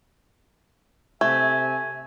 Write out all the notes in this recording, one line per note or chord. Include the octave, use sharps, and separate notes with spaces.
C3 A3 E5 G#5 G#6